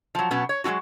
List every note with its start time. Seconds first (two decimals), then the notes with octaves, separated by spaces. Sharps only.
0.15 F3 F#3
0.31 B2 F#3 B3 C#4
0.49 C#5
0.64 F#3 G#3 C4 F4 F#4